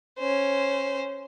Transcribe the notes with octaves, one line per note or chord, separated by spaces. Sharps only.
C#4 C5